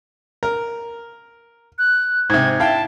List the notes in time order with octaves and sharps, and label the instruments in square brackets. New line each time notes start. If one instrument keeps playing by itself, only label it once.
[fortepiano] A#4
[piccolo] F#6
[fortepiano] G#2 C3 [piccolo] G#6
[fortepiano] E4 F5 G5 [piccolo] A5